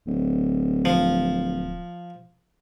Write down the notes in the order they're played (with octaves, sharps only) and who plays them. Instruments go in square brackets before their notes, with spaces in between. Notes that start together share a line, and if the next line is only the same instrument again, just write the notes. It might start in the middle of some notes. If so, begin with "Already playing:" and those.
[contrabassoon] D1
[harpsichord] F3